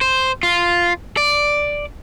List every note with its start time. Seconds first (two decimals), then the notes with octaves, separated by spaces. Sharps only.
0.01 C5
0.43 F4
1.17 D5